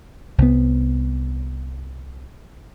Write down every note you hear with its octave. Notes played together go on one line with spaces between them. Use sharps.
C2 B3